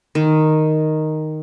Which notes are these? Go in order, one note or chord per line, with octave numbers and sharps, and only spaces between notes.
D#3